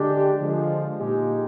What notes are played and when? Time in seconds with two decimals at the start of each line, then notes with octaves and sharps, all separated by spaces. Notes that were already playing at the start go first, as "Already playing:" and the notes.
Already playing: D3 G#3 D4 G4
0.40 D3 F3 G#3
0.98 A#2 G#3 D#4 G4